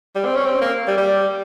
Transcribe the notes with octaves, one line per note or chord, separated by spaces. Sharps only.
G3
C4
C#4
C4
A#3
G3
G3